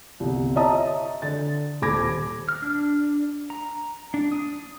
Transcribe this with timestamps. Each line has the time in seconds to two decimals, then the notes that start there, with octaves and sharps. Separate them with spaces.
0.20 G1 C2
0.56 C#5 D#5 E5 A5 A#5 D#6
1.22 D3 A6
1.82 D#1 B5 D6 G#6 A#6
2.49 F6
2.62 D4
3.50 A#5
4.14 D4
4.32 D#6